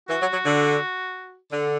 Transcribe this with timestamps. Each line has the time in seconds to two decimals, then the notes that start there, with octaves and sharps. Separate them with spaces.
0.09 E3 F#4
0.21 F#3
0.33 F#3
0.46 D3
1.52 D3